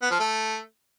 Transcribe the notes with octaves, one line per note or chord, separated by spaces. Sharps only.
B3
F3
A3